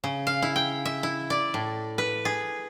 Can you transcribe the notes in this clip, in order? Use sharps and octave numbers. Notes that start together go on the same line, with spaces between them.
C#3
F5
E4
G5
E5
E4
D5
A2
B4
G#4